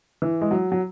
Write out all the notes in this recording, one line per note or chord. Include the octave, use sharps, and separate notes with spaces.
E3
G#3
F#3
F#3